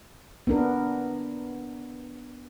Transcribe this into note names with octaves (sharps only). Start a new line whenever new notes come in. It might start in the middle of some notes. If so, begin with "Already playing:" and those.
B3 D4 A#4